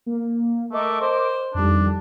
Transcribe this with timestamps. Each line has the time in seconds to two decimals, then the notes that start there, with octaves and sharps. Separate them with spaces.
0.06 A#3
0.72 A3 A#4 D#5 D6
1.01 C5
1.54 F2 D#3 G3 D4